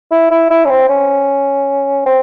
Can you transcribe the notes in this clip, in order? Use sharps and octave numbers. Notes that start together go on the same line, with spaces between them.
E4
E4
E4
C#4
C4
C#4
C4